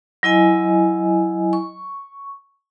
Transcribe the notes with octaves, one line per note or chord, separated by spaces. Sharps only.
F#3 E4 D#5 G#5
C#6